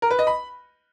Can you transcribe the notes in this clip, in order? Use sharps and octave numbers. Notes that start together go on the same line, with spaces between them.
A#4
B4
D#5
B5